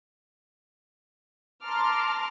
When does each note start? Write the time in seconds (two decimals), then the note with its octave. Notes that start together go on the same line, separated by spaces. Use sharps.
1.65 A5 A#5 C6 D6 F6